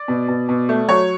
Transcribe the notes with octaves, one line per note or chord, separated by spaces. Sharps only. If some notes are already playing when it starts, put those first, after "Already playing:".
Already playing: D5
B2
B2
B2
A3
F#3 C#5